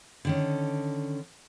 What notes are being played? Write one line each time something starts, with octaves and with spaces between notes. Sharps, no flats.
D3 D#3 C#4